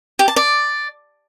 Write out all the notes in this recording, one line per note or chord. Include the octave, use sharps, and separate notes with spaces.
G4
A5
D5